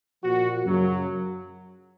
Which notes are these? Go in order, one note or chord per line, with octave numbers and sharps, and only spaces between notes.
A#2 F3 F#4
F#2 C#3 F#3